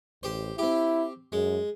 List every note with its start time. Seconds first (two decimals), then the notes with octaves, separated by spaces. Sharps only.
0.23 A1 G4 C5
0.58 C4 E4 G4
1.32 F#2 G#3